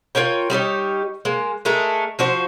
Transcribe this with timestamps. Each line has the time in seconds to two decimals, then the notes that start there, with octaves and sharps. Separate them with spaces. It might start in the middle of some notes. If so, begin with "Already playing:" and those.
0.15 F4 A#4 C#5 G5
0.50 G3 D#4 G4 C#5
1.25 G#3 A#3
1.65 G#3 A3 A#4
2.19 F3 F#4 C5